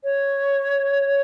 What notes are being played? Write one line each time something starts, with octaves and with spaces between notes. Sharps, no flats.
C#5